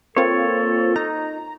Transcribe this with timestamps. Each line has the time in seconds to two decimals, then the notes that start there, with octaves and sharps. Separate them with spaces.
0.17 A#3 C4 F4 A4 C#5
0.96 D#4 A#5